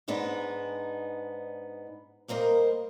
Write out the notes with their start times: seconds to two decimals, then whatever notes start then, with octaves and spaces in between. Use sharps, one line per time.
0.08 G#2 G#3 B3 D4 D#4
2.28 G3 A#3 A#4 C5 D#5